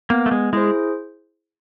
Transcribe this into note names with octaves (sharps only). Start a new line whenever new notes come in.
A#3 B3
A3
G#3
G#3 E4 G#4 C5